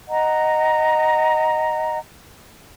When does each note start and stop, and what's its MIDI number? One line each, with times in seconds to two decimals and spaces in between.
0.08 1.98 75
0.08 1.98 78
0.08 1.98 82